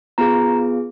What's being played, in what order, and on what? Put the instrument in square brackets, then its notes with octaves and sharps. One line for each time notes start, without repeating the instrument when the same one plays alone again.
[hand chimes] B3 F4 G#4 A#5